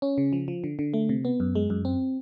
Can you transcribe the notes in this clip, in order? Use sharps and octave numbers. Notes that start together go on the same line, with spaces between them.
C#4
C#3
F3
F3
D3
D3
A3
C3
B3
F#2
G#3
F#2
C4